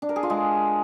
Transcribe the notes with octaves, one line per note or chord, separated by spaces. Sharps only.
D4
A#4
G#4
F4
G#3